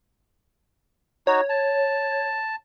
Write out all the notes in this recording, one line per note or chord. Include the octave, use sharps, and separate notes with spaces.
D#4 F#4 C#5
A5